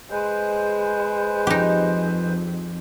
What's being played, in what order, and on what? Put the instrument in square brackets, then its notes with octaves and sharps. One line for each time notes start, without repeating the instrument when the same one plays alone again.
[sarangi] G#3 [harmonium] B4 C5
[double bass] F2 [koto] D#4 G4